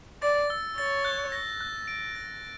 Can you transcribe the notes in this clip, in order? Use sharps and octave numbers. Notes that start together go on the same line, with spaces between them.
D5 A6
E6
C#5 A6
F#6
A#6
F#6
D7
A6